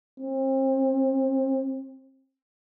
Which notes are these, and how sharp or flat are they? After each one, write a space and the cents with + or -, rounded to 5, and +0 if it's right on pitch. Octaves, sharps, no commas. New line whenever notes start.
C4 +35